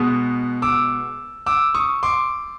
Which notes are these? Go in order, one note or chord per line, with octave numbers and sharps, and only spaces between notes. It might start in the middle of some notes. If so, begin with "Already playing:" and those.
Already playing: B2 G#3 B3 D#6
D6 E6
D6 E6
C#6 D#6
C6 D6